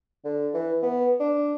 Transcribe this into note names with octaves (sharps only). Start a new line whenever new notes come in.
D3
E3
B3
D4